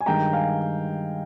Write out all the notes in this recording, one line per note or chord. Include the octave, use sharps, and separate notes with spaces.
G#5
G2 D#3 G#3 G5 A#5
F5 G#5